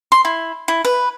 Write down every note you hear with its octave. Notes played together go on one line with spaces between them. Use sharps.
C6
E4
E4
B4